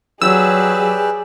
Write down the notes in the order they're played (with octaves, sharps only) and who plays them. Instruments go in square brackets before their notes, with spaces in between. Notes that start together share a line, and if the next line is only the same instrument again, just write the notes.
[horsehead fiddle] F#3 [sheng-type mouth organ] G4 B4 D5 [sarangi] G#4 [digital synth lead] E6